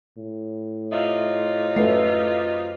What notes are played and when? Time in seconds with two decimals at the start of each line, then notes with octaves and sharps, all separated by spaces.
0.17 A2
0.92 C3 D#4 F4 E5
1.76 F#2 A3 B4 C7